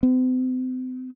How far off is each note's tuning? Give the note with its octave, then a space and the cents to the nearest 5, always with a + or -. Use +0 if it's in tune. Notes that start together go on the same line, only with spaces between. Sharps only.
C4 -40